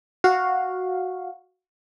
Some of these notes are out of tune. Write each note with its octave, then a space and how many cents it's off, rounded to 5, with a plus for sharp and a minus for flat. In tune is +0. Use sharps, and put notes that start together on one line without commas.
F#4 -5 F5 +5